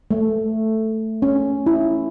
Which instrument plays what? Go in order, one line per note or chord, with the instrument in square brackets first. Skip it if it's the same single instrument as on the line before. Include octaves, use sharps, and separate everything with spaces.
[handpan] A3
C#4
E4